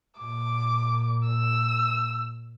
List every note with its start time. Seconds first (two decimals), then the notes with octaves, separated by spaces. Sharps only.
0.19 A#2 D6
1.27 E6